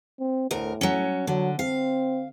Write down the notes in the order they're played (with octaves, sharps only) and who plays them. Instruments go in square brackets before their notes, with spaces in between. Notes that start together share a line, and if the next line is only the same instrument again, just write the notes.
[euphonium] C4
[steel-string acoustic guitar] D2 A#4 [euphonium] A2
[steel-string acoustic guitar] F#3 C#4
[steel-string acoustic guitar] D3 [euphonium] F#3
[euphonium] C4 [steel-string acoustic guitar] F5